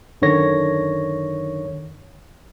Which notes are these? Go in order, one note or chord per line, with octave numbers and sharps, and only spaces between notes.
F#2 D3 D#3 C#5 A#6